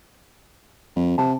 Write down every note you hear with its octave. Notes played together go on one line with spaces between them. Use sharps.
F2
C3 A5